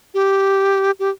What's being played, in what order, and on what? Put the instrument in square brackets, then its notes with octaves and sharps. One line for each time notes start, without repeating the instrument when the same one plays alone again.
[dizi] G4
G4